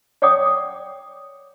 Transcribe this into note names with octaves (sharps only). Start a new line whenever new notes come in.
C#5 D5 F#5 G5 D6 D#6